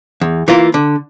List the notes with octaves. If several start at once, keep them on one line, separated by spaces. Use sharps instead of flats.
E2
E3 A#3 F4
D3